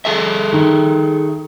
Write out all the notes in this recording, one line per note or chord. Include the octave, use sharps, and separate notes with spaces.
G#4 A4 E5
D#3